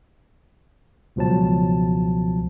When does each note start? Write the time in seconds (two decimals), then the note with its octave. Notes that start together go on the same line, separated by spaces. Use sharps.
1.16 C#2 B2 F3 F#3 A5